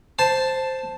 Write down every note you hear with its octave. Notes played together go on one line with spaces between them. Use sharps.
C5 A5